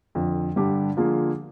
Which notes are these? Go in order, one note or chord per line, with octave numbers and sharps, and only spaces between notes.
F2 D3 F3
G2 D3 G3 D4 G4
D3 F3 A#3 F4 G#4